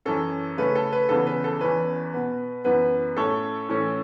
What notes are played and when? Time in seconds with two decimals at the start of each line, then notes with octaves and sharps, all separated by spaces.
0.05 F#2 E3 C#4 A4
0.58 C#3 A3 C#4 B4
0.75 A4
0.93 B4
1.09 E2 C#3 E3 B3 A4
1.27 B4
1.44 A4
1.61 E2 E3 C#4 B4
2.14 B2 B3
2.64 F#2 E3 B3 B4
3.17 A2 A3 C#4 A4 C#5
3.69 A2 E3 A3 C#4